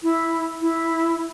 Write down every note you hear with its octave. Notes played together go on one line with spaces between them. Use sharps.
E4
E4